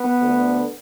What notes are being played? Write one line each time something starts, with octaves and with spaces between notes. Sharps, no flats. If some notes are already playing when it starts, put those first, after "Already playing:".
Already playing: B3
D2 D3